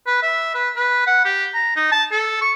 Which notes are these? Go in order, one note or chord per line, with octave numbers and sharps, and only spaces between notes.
B4
E5
B4
B4
F#5
G4
A#5
D#4
A5
A4
C#6